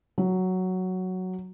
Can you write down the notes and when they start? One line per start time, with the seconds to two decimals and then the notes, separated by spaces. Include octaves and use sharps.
0.18 F#3